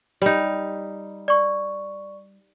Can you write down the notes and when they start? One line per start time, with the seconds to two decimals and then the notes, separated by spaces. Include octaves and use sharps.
0.22 G3 D#4
1.28 D5 C#6